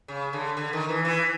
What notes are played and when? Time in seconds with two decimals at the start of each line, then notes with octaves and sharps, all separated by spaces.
0.08 C#3
0.33 D3
0.57 D3
0.73 D#3
0.89 E3
1.05 E3